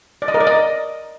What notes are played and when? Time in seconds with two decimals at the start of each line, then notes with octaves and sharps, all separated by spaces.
0.22 D5
0.28 D#5
0.34 A#4
0.41 D5
0.47 D#5